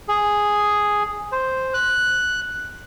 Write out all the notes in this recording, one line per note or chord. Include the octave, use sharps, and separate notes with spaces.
G#4
C5
F#6